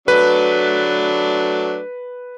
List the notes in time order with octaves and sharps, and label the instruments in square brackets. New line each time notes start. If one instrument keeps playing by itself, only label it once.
[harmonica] F#3 A3 D4 [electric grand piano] B4